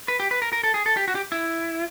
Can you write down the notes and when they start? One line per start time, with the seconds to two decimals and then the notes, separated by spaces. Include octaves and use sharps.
0.08 B4
0.20 G4
0.31 B4
0.42 A#4
0.53 A#4
0.64 A4
0.74 G#4
0.86 A4
0.97 G4
1.08 F#4
1.15 G4
1.32 E4